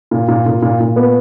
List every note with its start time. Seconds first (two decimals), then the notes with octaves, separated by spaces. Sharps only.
0.11 A#2
0.28 A#2
0.46 A#2
0.62 A#2
0.80 A#2
0.96 B3